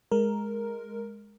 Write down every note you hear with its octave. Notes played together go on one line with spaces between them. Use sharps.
G#3 A#4